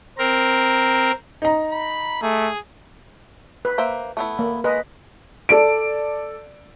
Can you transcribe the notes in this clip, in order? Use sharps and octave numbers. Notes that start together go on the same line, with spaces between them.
C4 A#4
D#4 A#5
B5
A3 G#4
B4
A#3 C5 E5
A3 B3 E4
A#3
G#3 B4 D#5
A4 D5 D7